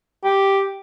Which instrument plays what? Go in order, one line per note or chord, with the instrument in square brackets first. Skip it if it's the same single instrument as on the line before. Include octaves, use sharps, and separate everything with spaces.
[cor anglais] G4